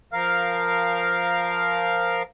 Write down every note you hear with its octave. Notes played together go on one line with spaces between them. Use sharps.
F3 A#4 F5 F6